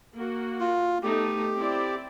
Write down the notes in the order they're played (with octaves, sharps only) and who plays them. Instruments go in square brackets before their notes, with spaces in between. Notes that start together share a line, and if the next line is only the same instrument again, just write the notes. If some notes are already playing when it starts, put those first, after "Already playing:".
[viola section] A#3 F#4
[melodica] F4
[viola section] A3 B3 D#4 [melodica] G4
[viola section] C4 E4 D5